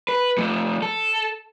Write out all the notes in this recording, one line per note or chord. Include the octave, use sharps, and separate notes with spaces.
B4
F3 A3
A4